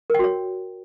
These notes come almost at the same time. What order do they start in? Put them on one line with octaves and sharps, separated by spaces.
A#4 G5 F#4 C#5